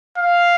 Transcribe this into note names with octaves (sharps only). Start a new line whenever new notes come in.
F5